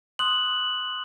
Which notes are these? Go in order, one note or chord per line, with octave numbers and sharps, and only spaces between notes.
C6 D#6 F#6 F#7